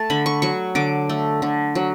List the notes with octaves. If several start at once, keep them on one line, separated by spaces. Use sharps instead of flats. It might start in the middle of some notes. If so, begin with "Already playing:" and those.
Already playing: A3 A5
D3 B5
C#6
F#3 C#6
D3 D6
A3
D3
F#3